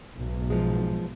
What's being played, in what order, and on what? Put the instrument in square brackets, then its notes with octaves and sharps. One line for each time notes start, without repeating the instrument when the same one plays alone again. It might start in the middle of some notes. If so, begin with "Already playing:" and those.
[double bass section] B1 G#2
[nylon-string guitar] F3 G#3